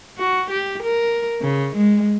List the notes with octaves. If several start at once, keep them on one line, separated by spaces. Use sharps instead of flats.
F#4
G4
A#4
C#3
G#3